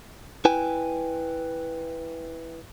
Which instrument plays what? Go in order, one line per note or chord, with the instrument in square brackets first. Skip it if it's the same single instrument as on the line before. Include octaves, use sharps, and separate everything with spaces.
[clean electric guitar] E4 B4 G5 G#5